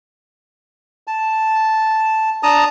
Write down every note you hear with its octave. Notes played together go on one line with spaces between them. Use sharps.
A5
D4 A5 A#5 D#6